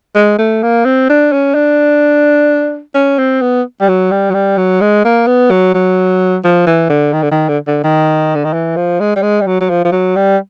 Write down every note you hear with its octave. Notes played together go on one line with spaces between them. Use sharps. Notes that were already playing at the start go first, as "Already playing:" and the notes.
G#3
A3
A#3
C4
D4
C#4
D4
C#4
C4
B3
G3
F#3
G3
F#3
G3
F#3
G#3
A#3
B3
F#3
F#3
F3
E3
D3
D#3
D3
D#3
D3
D3
D#3
D3
D#3
E3
F3
G#3
G3
G#3
G3
F#3
F#3
F3
F3
F#3
G3